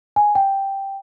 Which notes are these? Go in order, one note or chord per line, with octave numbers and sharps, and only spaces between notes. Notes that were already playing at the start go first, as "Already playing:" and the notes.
G#5
G5